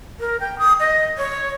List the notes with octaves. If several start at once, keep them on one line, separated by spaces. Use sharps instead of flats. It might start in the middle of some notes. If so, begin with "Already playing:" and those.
A#4
G5
D#6
D#5
C#5